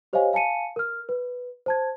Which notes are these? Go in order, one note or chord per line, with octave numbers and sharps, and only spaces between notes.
G4 C5 C#5 D#5 F5 G#5
F5 G#5 A5 C#7 D#7
A#4 F6
B4
C5 A5 G#6